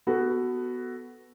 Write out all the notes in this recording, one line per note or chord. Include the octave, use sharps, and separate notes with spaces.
B3 F#4 A4